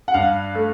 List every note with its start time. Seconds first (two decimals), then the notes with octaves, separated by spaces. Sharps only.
0.08 F#5
0.14 G2 F5
0.55 A3